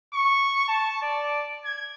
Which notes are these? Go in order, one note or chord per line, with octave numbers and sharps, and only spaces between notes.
C#6
A5
D5
G#6